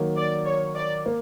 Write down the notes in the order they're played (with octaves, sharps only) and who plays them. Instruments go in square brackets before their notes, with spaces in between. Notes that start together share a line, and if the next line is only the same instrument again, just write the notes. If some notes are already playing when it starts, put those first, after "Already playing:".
Already playing: [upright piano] D#3 F#3 A#3
[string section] D5
C#5
D5
[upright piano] A#3